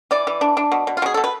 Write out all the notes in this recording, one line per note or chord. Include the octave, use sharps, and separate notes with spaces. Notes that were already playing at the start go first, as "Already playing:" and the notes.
E3 D5
E3
D4
D4
B2
B2
F4
B2 G#4
B2 A4
B4